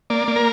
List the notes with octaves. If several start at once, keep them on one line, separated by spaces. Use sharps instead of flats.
A#3 D5
A#3
A#4